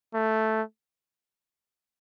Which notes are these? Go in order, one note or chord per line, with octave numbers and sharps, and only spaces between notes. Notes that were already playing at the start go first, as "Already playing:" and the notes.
A3